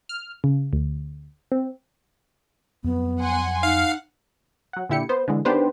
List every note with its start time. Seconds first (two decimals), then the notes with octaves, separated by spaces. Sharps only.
0.09 F6
0.44 C#3
0.73 D2
1.52 C4
2.84 F2 F#3 B3
3.20 F#5 G#5 C6
3.63 D#4 F5 F#5
4.73 F#3 F#5
4.89 A#2 D3 E4 G4 C#7
5.09 B3 C5
5.28 D3 E3 G#3
5.45 D#3 B3 D4 G4 B4 C5